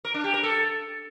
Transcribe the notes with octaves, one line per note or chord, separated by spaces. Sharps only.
A#4
D4
G4
A#4
A4